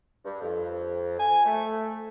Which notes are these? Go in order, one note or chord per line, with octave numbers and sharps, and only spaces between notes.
G2
F2
G#5
A3